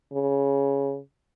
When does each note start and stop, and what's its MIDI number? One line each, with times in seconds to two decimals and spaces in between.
0.13 0.98 49